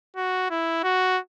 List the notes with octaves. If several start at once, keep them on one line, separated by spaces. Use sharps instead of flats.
F#4
E4
F#4